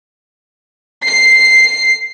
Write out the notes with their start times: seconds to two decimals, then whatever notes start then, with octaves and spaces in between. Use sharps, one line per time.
1.06 C7